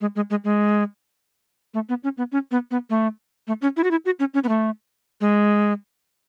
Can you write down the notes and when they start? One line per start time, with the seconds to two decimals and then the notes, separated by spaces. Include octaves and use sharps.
0.01 G#3
0.16 G#3
0.30 G#3
0.44 G#3
1.74 A3
1.89 B3
2.04 C#4
2.17 B3
2.32 C#4
2.51 B3
2.71 B3
2.90 A3
3.48 A3
3.62 C#4
3.77 E4
3.84 F#4
3.91 E4
4.05 F#4
4.20 C#4
4.34 C#4
4.44 B3
4.49 A3
5.21 G#3